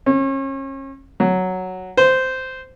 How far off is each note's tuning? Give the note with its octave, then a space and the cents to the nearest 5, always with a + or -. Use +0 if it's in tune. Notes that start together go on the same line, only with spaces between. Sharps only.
C#4 -35
F#3 +0
C5 -10